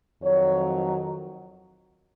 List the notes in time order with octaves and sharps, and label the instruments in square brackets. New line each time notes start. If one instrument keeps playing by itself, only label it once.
[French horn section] F2 D#3 F#3 C#5